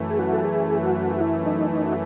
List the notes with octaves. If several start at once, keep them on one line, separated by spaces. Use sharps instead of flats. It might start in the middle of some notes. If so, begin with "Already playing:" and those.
Already playing: F#2 E3 A3
G#4
F#4
A4
G#4
F#4
F#4
E4
D#4
D#4
F#4